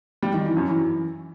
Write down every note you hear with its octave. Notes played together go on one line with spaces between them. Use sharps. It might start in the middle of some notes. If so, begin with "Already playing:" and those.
G3
D#3
E3
F#2
E3